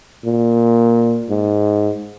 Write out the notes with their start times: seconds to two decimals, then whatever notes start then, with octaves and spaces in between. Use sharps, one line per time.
0.25 A#2
1.29 G#2